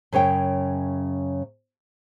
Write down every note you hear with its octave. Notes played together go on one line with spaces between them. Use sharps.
F#2 C#3 C#5 G5